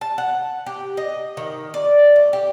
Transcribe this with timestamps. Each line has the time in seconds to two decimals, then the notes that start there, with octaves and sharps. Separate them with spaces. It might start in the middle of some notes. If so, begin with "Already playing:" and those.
0.01 A5
0.18 F#5
0.66 G4
0.97 D#5
1.37 D#3
1.74 D5
2.16 A3
2.33 G4